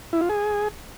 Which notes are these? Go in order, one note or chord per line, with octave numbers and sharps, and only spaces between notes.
E4
F4
G#4